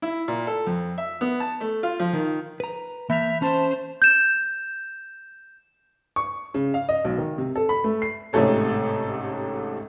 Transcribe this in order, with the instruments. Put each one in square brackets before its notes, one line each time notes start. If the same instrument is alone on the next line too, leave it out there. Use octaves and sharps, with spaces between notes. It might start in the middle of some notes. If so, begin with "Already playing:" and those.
[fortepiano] E4
A#2
A4
F2
E5
B3
A5
A3
F4
F3
D#3
[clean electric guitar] B4 A#5
[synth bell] E3 G6 F7 [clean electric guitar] A#3 [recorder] E5
[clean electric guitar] C#4 [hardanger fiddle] C5 [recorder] A5
[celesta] G6 E7
[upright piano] C#6
C#3
F5
D#5
B1
D#3
C3
A4
B5
A3
C7
A1 G#2 C3 A3 A4 C#5